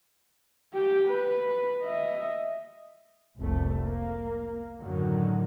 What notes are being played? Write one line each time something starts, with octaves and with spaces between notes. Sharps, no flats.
G4 G5
B4
D#5 E5
F1 C2 A3
A#3
F#2 A2 D3 D#3 F#3